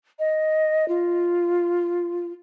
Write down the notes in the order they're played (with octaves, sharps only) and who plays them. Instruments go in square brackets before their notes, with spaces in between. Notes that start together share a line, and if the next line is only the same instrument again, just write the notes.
[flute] D#5
F4